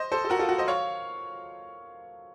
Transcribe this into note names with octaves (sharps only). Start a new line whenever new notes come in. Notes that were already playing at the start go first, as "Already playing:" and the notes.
Already playing: C5 D#5
A4 C5
A4
F#4 A#4
F4 A4
F#4
C5 D#5
C#5 F5